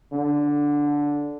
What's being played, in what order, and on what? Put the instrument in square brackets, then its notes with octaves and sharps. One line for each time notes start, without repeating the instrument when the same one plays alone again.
[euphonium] D3